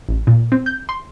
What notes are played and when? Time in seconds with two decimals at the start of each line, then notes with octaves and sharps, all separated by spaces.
0.09 A1
0.27 A#2
0.52 C4
0.66 G6
0.89 C6